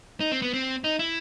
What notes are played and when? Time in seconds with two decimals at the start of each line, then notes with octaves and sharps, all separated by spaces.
0.20 D#4
0.32 C4
0.42 B3
0.53 C4
0.84 D#4
0.99 E4